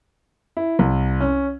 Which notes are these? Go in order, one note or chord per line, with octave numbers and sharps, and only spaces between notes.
E4
C2
C#4